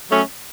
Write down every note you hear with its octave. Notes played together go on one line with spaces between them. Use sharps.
F#3 A3 C#4